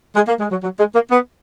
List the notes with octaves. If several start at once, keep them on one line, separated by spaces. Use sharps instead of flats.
G#3
A#3
G#3
F#3
F#3
G#3
A#3
B3